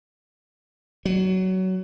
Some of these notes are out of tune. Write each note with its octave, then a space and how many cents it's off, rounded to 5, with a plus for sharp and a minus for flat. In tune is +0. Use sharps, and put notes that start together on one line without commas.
F#3 +20